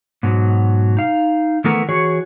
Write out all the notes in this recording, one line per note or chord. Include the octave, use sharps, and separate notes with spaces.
G#2 B2 F#3
D#4 F5
D#3 E3 A3 B3 A#4
E3 F#4 G#4 C#5